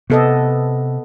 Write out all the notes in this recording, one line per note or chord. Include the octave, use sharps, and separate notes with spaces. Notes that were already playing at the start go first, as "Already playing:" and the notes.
C3 B3 A4 D#5